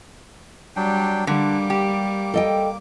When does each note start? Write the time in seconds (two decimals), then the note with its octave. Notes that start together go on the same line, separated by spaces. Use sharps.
0.76 F#3 G3 D4 G5
1.27 D3 G3 A#3 D6
1.70 G4
2.34 A4 D#5 G5